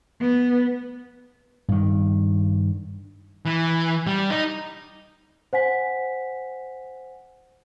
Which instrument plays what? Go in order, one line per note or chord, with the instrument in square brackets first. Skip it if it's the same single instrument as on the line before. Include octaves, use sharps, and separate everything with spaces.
[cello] B3
[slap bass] G2 D#3
[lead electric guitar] E3
G3
D#4
[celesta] C5 F#5 G#5 B6